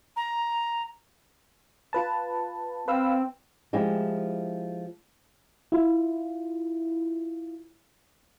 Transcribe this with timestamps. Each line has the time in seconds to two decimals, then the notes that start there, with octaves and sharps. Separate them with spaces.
0.16 A#5
1.93 F4 B4 A5
2.88 C4 B4 F5 E6
3.73 F3 G#3 E4 G4
5.72 E4 F4